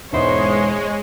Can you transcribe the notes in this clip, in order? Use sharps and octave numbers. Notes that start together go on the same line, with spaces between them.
E1 G#2 G#3 B3 E4 C5 C#5 D#5